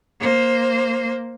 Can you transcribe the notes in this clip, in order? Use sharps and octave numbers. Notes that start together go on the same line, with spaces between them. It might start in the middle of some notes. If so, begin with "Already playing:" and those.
A#3 C5